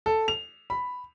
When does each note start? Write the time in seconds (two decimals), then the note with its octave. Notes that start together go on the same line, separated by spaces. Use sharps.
0.06 A4
0.28 F7
0.70 B5